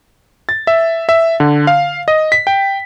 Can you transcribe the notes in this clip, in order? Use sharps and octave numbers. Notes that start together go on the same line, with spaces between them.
A6
E5
E5
D3
F5
D#5
B6
G5